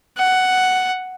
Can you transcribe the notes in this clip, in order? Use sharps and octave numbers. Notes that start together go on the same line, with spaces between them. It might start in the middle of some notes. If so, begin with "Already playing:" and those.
F#5